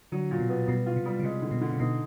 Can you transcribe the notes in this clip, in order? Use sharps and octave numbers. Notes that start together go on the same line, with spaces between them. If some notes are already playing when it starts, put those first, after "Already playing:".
D3 F#3
A#2
B2
B3
B2 G3
F4
C3
G3
C#3
C3 G#3
D3
B2
D3
C3
B2 D#4